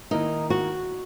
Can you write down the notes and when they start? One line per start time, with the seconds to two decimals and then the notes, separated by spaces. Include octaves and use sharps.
0.11 D#3 A#3 D#4 E4 A#4
0.50 F#4